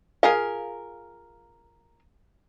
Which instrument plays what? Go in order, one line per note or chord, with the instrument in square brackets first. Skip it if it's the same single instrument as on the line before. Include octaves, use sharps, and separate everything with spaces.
[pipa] F4 G#4 A#4 [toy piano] F5